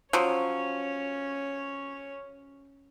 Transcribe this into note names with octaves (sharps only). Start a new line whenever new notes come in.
F3 F#3 C#4 C#5